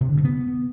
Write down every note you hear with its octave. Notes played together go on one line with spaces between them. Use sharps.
C3
D3
G2
B3